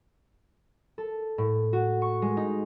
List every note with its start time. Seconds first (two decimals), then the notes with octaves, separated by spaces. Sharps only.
0.98 A4
1.38 A2
1.73 F#4
2.02 C#6
2.22 G#3
2.37 D#4